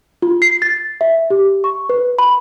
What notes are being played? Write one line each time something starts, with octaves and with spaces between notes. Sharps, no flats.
F4
C7
A6
E5
G4
C#6
B4
B5